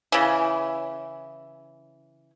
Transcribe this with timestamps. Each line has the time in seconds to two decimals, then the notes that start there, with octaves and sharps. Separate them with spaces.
0.12 C#3 E3